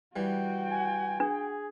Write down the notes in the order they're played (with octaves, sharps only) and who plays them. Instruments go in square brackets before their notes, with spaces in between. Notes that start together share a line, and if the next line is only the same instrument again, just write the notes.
[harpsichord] E3 G3 [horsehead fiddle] F#4 G5
[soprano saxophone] G#5
[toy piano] D4 [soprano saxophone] G#4